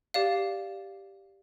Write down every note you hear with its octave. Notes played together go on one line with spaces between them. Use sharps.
G4 D5 F5